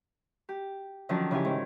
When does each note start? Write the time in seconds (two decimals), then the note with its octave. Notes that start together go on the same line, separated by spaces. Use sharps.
0.49 G4
1.09 D3 D#3 F3 F#3 C#4 D4
1.31 C#3 E3 E4 G4 G#5
1.45 G#2 D#3